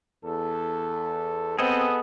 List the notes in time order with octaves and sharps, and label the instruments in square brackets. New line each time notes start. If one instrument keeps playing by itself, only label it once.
[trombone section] E2 A4
[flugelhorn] B3 [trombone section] C4 [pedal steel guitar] G#4 A4 D#5